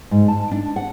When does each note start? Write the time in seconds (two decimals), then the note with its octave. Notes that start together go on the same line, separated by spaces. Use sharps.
0.11 G#2
0.28 A5
0.52 D4
0.76 F#5